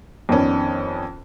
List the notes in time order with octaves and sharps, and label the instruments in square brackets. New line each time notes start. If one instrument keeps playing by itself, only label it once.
[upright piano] F2 D#3 B3 C#4 D4